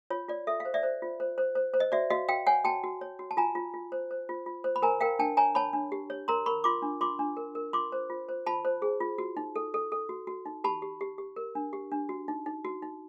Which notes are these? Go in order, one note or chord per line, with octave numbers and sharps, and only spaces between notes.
F4 C#5
F4 D5
A4 E5
F5
C5
D5 E5
C5
F4
C5
C5
C5
C5
D#5
F#4 D5 E5
F#4 D#5 F5
F#4 F5 G5
C#5 F#5 G#5
F#4 G5 A5
F#4
C#5
F#4
A5
F4 G#5 A#5
F4
F4
C5
C5
F4
F4
C5
B5
A#4 G#5 A#5
A#4 F5 G5
D4 G5 A5
C#5 G#5 A#5
C#5 A5 B5
D4
G4
C#5
A#4 A#5 C6
A#4 B5 C#6
F4 C6 D6
D4
F4 C6 D6
D4
A#4
A#4
F4 C6 D6
C5
F4
C5
F4 A5 B5
C5
G#4
F4
F#4
D#4
A4
A4
A4
F#4
F#4
D#4
G4 A5 B5
G4
G4
G4
A#4
D4
G4
D4
F#4
D#4
D#4
F#4
D#4